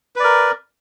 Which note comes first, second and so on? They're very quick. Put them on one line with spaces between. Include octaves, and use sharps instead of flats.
B4 D5 A#4